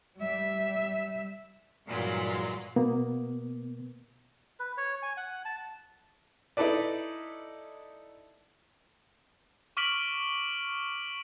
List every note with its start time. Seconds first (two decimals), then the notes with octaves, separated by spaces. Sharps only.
0.17 G3 E5
1.86 G2 A#2 E3 F#3 G#3 F4
2.76 B2 A#3 B3
4.60 B4
4.78 C#5
5.03 G#5
5.17 F#5
5.45 A5
6.57 D#4 E4 A4 B4 D5
9.77 C#6 D6 F6 B6 D7 F#7